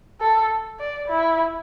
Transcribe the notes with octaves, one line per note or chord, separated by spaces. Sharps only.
A4
D5
E4